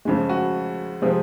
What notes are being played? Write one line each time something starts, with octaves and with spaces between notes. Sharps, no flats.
F2 C#3 G#3
F#4
C3 F3 G#3 C4